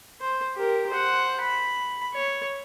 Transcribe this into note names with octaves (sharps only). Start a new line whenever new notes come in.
C5
G4 A#4
C5 F#5
B5
C#5